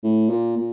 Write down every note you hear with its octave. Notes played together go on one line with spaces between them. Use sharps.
A2
A#2
A#2